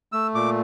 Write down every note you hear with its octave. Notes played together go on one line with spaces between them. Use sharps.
A3 E6
A#2 D6